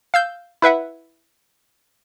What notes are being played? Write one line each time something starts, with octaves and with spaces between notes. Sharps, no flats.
F5 E6 G6
E4 B4 E5 F#5